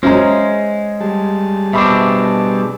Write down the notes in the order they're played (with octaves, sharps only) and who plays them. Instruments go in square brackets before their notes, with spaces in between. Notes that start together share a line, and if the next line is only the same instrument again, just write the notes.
[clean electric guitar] G#3 [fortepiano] C#4 [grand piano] C5 E5 A#5
[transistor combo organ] G3 G#4 A5
[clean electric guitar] B2 C4 D4 [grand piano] E5 B5 D6